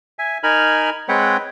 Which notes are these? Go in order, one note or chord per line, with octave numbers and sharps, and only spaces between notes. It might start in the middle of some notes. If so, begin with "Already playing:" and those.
E5 G#5
D#4 A#4 G#5 B5 F6
G#3 C4 B4 C#5 F#5 G5